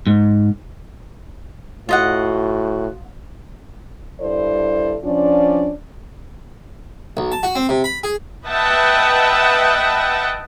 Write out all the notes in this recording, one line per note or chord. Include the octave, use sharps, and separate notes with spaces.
G#2
A2 F4 F#4 D#5 F#5
G2 E4 A4 C5 D5
F3 C#4 D4 F4 D5
B1
A5
F#4
C4
C3
B5
G#4
B4 D#5 E5 F#5 G5 A5